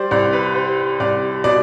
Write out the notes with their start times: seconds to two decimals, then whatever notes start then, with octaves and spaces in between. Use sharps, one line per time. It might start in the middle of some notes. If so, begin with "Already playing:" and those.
Already playing: G3 C5 D5
0.11 C2 D5
0.33 B4
0.55 G3 C5
1.00 C2 D5
1.44 B2 D5